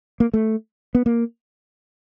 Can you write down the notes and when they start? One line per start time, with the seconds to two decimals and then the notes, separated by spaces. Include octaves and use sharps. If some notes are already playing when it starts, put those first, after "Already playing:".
0.20 A#3
0.34 A3
0.95 B3
1.06 A#3